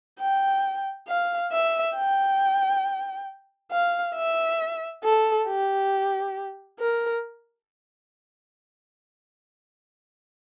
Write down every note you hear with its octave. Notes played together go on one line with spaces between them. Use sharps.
G5
F5
E5
G5
F5
E5
A4
G4
A#4